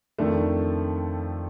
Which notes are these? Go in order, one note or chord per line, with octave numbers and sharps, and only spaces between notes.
F2 D#3 A3 D4